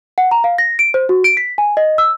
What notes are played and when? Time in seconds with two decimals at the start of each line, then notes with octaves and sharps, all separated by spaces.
0.18 F#5
0.31 A#5
0.44 F5
0.58 A#6
0.79 D7
0.94 C5
1.09 F#4
1.24 D7
1.37 B6
1.58 G#5
1.77 D#5
1.98 E6